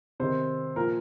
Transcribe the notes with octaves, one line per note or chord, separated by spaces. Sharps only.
C3 D#3 C5
A#2 F3 A#4